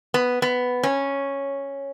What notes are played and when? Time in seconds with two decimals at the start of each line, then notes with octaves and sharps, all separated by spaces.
0.14 B3
0.42 B3
0.83 C#4